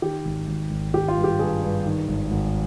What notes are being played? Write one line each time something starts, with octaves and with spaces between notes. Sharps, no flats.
D#3 G4
G#1
G#1
G#1
G#1 G4
F4
G2
G4
G2 G#4
G2
D#3
G#1
G#1